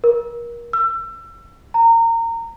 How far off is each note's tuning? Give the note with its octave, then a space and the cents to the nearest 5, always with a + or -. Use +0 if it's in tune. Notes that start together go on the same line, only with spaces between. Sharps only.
A#4 +25
E6 +30
A#5 -25